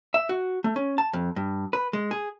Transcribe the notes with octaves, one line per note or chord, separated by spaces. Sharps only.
E5
F#4
A3
C#4
A5
F2
G2
B4
G#3
G#4